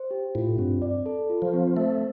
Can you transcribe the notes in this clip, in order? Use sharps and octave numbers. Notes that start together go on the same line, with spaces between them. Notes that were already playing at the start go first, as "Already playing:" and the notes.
Already playing: C5
G4
A2 F4
G2 C4
D5
A4
F4
F3
C4
A3 C5